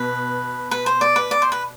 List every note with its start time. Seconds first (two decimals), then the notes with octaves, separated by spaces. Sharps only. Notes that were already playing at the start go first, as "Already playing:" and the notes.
Already playing: B2 B3 B4
0.71 B4
0.86 C5
1.01 D5
1.16 B4
1.31 D5
1.42 C5
1.52 B4